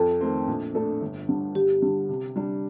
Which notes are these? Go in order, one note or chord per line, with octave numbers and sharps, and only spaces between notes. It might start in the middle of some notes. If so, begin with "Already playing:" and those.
Already playing: F2 A4
D#3 A3 C4
A#1
A2 A3 D4 A4
G1
G2 D3
G1 G4
G2 D3
C3
G3 D4